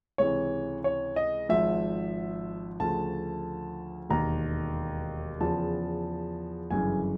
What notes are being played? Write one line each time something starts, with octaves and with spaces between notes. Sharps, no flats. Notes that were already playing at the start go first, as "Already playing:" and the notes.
C#2 C3 E3 C#5
C#5
D#5
G#1 G#2 F3 E5
D2 C#3 F3 A5
E1 D#2 D#3 A#5
E2 C#3 F3 A5
G1 F#2 C#3 E3 G#5